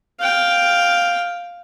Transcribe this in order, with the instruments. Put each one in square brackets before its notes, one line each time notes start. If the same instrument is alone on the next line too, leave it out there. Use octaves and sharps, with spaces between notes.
[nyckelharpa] F5 G5